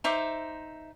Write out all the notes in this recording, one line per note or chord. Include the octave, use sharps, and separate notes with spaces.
D#4 C5 E5 D6